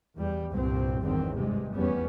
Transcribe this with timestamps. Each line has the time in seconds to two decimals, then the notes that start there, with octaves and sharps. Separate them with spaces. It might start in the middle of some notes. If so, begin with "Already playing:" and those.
0.16 E2 G3
0.52 C2 G2 A#2 C4
1.03 G#1 E2 G2 D#3 C4
1.33 G2 C3 G#3
1.73 F1 E2 G3 B3 C#4